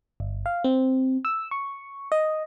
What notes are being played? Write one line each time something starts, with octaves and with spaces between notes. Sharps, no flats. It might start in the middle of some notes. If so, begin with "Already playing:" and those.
G1
F5
C4
E6
C#6
D#5